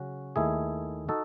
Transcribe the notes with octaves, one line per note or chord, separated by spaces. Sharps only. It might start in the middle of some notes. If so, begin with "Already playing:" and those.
Already playing: C#3 F#3 C#4 F#4
D#2 D#3 A3 E4 G#4
D#4 F#4 A4